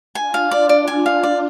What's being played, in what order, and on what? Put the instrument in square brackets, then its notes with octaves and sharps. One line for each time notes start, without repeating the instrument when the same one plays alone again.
[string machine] D4 F4 [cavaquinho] G#5
[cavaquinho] F5
D5
D5
G#5
F5
D5